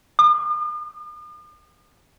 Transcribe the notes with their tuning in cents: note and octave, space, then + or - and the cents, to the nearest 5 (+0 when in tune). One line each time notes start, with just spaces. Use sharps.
D#6 -45